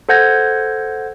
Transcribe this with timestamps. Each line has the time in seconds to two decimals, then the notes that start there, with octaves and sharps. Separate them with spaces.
0.09 A4 C5 F#5 G6 G#6 A#6